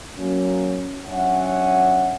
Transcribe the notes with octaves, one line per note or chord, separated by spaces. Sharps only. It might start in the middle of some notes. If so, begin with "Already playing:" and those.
F#3 A#3 C#4
F#3 C#4 D4 E5 F#5